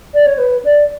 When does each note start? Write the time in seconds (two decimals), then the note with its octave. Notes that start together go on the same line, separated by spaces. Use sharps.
0.14 D5
0.26 C#5
0.38 B4
0.65 D5